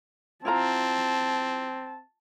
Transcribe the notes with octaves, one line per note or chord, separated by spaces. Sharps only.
C4 E4 F4 A5 A#5